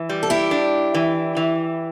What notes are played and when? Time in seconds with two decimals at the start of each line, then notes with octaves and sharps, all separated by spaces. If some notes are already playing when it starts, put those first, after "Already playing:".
Already playing: E3
0.09 G3
0.23 A4
0.30 E4 G4
0.51 D4
0.94 E3
1.37 E3